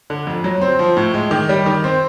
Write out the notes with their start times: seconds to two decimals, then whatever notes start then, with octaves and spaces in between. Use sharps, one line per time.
0.10 D3
0.27 F2
0.44 F#3
0.61 C4
0.79 F3
0.97 A2
1.14 G#3
1.31 D#3
1.49 G3
1.66 D#3
1.84 C4